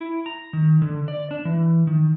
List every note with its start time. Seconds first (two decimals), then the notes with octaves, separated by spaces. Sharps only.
0.01 E4
0.26 A#5
0.53 D#3
0.82 D3
1.08 D5
1.31 D4
1.45 E3
1.87 D#3